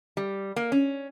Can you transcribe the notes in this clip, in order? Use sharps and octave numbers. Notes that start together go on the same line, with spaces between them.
G3
A#3
C#4